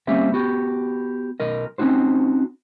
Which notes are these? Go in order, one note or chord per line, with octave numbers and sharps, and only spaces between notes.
G3 A#3 C4 C#4 E5
B3 F#4 G4
B1 A#4 D#5
C4 C#4 D#4 F#4 C5